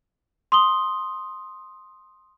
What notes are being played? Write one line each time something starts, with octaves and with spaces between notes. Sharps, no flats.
C6 D#6 G7